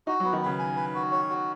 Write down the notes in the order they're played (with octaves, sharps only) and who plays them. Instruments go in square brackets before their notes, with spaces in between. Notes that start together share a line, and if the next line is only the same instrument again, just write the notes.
[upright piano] D#4 [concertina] F#4
[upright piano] F#3
[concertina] B3
[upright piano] D#3
[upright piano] C#3 [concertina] B4
[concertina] G#5
B4
F#4
C#5
F#4